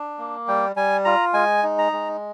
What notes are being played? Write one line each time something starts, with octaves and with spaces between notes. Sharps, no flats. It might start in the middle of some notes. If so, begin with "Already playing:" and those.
Already playing: D4
A#3
G3 G5
G3 G#5
F4 A#5
G#3 G#5
D#4
A#5
G#3